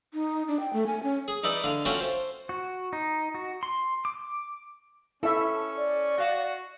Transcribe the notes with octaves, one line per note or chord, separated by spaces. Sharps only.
D#4
D4
G5
A3
G#5
C#4
G#4
D#4 E4 B4 D5
D3 F5
C#4 F4 F#4 A4 E5 G5
C5
F#4
D#4
F#4
C6
D6
C#4 E4 A4 E5 C#6
D5
F#4 D#5 F5